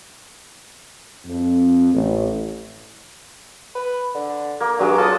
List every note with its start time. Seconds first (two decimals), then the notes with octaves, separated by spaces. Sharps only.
1.26 F2
1.93 A1
3.75 B4
4.15 D3
4.60 A#3
4.79 G2 F#3 G#3 D6
4.98 F4 A4 D#6